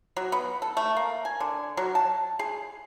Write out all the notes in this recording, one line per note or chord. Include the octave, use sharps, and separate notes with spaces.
F#3
B3
A4
A3
A#3
G#5
D3
F#3
A5
G#4